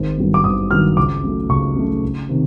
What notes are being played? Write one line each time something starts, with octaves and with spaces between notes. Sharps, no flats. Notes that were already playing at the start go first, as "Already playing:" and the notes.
Already playing: G#1
G2 D#3 F#3 B3
D6
G#1 D#6
G2 D#3 F#3 B3 F6
C#2 D6
C#3 F#3 A3
C#2 C#6
C#3 F#3 A3
C#2
C3 D#3